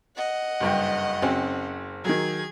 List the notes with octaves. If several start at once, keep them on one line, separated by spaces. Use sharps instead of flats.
D#5 F#5
F#1 G2 G5
F#1 C4 C#4
D#3 F#3 G#4 G#6